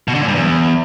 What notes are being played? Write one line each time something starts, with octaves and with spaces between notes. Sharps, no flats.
B2
D3
A#2
G2
E2